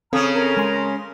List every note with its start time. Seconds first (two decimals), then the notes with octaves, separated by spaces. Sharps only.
0.13 C#3 C4 C#4 A4 A#5 D#6 F6
0.35 A#4 A#5
0.57 G#3 G#5 C6